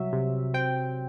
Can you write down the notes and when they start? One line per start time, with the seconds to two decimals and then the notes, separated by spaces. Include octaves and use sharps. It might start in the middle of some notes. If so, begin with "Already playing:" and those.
Already playing: C2 F#3 E5
0.13 C3
0.54 C4 G5